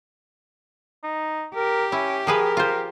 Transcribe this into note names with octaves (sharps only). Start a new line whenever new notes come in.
D#4
G4 A#4
C#4 E4
F3 G#4 A#4 B4
F4 C5